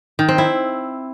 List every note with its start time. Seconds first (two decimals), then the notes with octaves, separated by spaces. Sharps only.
0.19 D#3
0.29 C4
0.38 E4